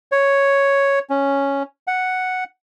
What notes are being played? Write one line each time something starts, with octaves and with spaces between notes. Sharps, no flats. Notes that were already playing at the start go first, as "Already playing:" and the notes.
C#5
C#4
F#5